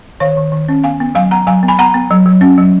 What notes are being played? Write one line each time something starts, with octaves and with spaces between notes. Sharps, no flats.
D#3 C#5 F5
D#3
D#3
C#4
B3 F5 G#5
B3
F#3 F5 G#5
B3 F#5 A#5
F#3 F5 G#5
B3
G#5 B5
B3 F#5 A#5
B3
F#3
F#3
C#4
F#3